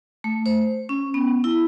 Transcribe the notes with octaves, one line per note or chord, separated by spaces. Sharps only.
A3
C5
C#4
B3
E4